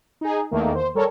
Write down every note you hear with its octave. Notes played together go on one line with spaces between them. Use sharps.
D#4 G#4
E2 D#3 A3 A#3
C5
G3 A4 A#4 C#5